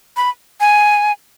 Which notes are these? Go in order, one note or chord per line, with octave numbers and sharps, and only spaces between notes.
B5
G#5